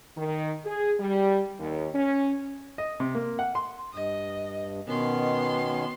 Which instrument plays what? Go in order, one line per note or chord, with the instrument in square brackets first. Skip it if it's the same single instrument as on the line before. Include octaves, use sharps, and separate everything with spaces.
[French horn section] D#3
G#4
G3
D#2
C#4
[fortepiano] D#5
C3
A#3
F#5
C6
[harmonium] G2 [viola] D#5
[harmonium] B2 D#3 C#4 [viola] B3 C6